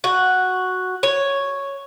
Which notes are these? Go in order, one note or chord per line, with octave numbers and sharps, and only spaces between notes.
F#4
C#5